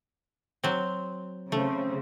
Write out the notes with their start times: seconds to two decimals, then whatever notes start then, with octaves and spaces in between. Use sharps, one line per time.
0.64 F#3 C4
1.52 C#3 A3 C4